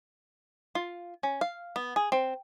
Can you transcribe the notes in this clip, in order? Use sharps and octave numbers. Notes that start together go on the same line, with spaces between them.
F4
C#4
F5
B3
G#4
C4